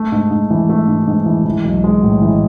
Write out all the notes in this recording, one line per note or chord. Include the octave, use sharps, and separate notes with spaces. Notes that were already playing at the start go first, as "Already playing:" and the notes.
Already playing: A3
G#2
G#2
E3
A3
G#2
G#2
E3
E3
B1
G#3
A2
E3